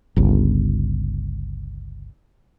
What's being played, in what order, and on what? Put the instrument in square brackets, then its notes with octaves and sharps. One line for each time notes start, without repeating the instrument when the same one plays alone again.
[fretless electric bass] G1 C#2